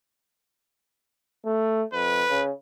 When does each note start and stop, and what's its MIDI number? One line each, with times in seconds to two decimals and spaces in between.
1.45 1.83 57
1.93 2.24 41
1.93 2.44 71
2.29 2.51 49